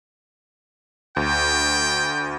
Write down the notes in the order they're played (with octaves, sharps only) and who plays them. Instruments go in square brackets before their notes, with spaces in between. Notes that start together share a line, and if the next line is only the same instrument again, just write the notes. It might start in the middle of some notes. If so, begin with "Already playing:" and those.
[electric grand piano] D2 [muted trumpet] G5